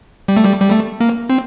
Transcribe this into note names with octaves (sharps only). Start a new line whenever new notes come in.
G3
A3
G3
G3
A3
A#3
C4